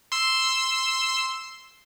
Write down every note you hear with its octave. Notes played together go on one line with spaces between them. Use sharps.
C6 E6